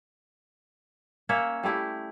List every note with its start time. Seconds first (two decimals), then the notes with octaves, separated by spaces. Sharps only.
1.29 A#3 C#4 C#5 E5
1.63 G3 A3 E4 G4